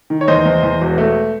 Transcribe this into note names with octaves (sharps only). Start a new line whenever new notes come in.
D#3
C#5
E2 C5 D#5
E2
E2
E1
A3